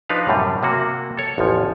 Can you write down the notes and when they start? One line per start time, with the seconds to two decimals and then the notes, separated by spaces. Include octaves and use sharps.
0.09 F3 D4 D#4 B4 F5
0.28 F#2 A2 C3 G3
0.63 C3 A#3 F#4
1.17 A4 C#5
1.38 A1 E2 F3